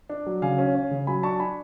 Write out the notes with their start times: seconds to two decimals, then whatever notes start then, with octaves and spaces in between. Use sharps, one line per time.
0.10 D4
0.26 F#3
0.42 C#3 F5 G#5
0.58 C#4
0.75 C#4
0.91 C#3
1.07 F#3 G#5 B5
1.23 D4 A5 C#6
1.39 D4 G#5 B5